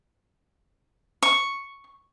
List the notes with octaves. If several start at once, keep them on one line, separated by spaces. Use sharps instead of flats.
C#6